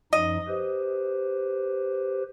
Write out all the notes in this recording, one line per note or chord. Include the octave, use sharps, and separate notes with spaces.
F#2 F3 D#4 D#5
G4 B4 C5